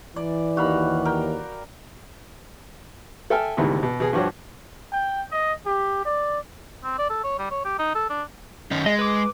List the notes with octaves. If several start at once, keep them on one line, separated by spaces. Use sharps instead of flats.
E3 D5
D#2 F#4 F5 B5
A#4 G5
A4 E5 G5 G#5 F6
D2 G#2 C3 D#3 E3 B3
B2
B2 G#4
G2 F3 F#4 G4 C#5
G5
D#5
G4
D5
C4
D5
A4
C#5
G3
C#5
G4
D#4
A4
D4
D#3 C#4 D#4
G#3 D#5
B4 D6